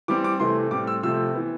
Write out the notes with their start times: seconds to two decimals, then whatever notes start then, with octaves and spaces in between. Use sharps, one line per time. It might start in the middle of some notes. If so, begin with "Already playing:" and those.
0.08 E3 G3 C4 D6
0.24 D6
0.40 C3 E3 A3 C4 C6
0.71 A2 G3 C4 D6
0.87 E6
1.03 C3 F3 A3 C4 E6
1.34 E3 B3